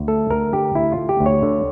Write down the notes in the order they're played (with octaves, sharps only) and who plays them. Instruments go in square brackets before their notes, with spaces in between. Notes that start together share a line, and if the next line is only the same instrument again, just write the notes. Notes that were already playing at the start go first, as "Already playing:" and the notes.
Already playing: [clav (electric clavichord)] D2
A3 A4
D2 A#4
D3 G4
D2 E4
F4
A3
G4
D2
C#5
D3